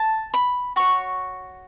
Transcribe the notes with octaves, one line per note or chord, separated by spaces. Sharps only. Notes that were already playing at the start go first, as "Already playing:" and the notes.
Already playing: A5
B5
F#4 C#5 C#6